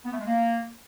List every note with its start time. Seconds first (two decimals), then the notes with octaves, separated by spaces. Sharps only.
0.05 B3
0.12 A3
0.20 G#3
0.27 A#3